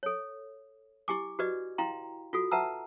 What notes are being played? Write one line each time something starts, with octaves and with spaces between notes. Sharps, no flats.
A4 C#5
E4 G4 G#5 D6
F#4 G4 B4 D5 D#5
E4 F5 G5 A#5 C6
F4 F#4 A4
B4 E5 F#5 A5 A#5 E6